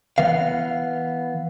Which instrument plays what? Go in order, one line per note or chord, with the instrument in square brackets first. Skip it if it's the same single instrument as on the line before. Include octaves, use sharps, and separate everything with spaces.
[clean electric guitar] E3 B3 F5